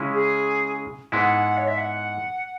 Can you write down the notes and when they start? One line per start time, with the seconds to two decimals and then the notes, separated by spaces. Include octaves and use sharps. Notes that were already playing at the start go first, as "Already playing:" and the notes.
Already playing: C#3 G#3 C#4 E4
0.14 G#4
1.12 G#2 G#3 B3 E4 F#5
1.57 C#5
1.68 E5
1.78 F#5